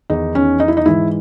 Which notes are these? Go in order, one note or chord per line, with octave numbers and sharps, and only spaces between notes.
E2 D#3 D#4
C#4
D#4
E4
D#4
G#2 E3 E4